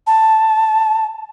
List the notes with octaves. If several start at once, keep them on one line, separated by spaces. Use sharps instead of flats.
A5